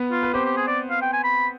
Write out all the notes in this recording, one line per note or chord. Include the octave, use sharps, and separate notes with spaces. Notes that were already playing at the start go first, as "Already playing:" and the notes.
Already playing: B3 B4
F4
B4
C4 G4 C5
G4
G#4
D5
F5
G5
G#5
B5